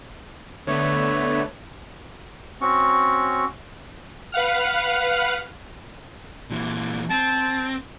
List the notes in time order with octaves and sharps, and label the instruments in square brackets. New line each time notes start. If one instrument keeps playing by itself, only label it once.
[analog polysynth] D3 A3 B3 [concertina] C#5
[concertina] C4 C#4 F#4 C#6
[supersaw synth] B4 F5 F#5 F6
[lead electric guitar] A#2 E3
[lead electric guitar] C4 [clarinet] A5